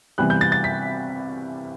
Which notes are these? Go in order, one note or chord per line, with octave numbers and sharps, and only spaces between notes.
C3 E3 G3 B3 F#6
G6
A6
A6
B6